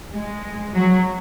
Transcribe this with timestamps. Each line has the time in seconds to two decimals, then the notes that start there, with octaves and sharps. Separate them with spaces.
0.13 G#3
0.73 F#3